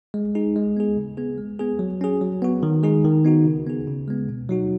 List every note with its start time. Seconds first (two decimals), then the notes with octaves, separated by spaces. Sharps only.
0.14 G#3
0.35 D#4 G#4
0.56 G#3
0.77 B3 G#4
0.97 C#3
1.17 B3 G#4
1.38 G#3
1.59 B3 G#4
1.79 F#3
2.01 C#4 G#4
2.21 F#3
2.42 B3 F#4
2.63 D#3
2.83 G#3 D#4 G#4
3.04 D#3
3.24 B3 D#4 F#4
3.45 C#3
3.66 B3 G#4
3.88 C#3
4.08 G#3 B3
4.29 B2
4.49 F#3 D#4 F#4